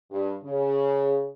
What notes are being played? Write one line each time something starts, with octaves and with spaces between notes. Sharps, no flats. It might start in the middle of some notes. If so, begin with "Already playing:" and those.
G2
C#3